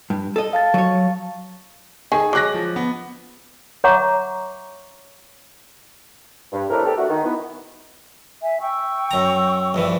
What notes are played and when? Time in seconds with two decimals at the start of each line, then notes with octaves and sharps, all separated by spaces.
0.10 G2
0.36 A4 D#5
0.53 F5 A5 A6
0.74 F#3 C#5
2.12 D#3 G#4 A4 G#5
2.33 F#3 G#3 D6 F#6 A#6
2.54 F3
2.76 B3
3.84 C#5 E5 F#5 A#5 C#6 D6
6.53 G2
6.70 A2 C3 A3 D4 A#4
6.85 E2 C3 G4 A4
6.97 A3 D4 F#4
7.10 D#3
7.24 E3 B3
8.42 E5 G#5
8.62 G5 C#6 E6
9.11 F#2 A#5
9.74 A#1 G2 E3